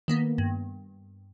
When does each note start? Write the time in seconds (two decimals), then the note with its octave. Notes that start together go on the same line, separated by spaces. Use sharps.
0.08 D#3 A#3 B3
0.38 G2